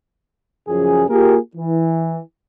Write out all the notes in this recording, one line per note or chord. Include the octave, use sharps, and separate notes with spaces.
F#2 C#3 F3 G#4
A#3 F4 G4 G#4 A#4
E3